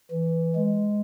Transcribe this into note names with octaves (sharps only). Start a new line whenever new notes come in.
E3
G#3